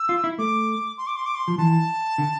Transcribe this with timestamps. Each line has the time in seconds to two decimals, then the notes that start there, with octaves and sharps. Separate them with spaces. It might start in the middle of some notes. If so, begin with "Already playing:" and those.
Already playing: E6
0.09 F4
0.24 E4
0.39 A3 D6
0.98 C6
1.07 D6
1.16 C6
1.26 D6
1.35 C6
1.48 F3
1.58 E3 A5
2.18 D3